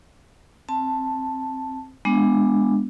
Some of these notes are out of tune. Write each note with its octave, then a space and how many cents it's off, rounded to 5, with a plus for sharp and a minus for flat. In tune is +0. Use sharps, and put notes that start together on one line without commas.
C4 +10 A5 +0
G#3 -15 B3 +0 D4 +0